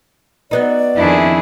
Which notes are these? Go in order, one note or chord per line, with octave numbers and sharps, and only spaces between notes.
F#3 B3 D#4 D5
F2 D#3 D4 E4 G#4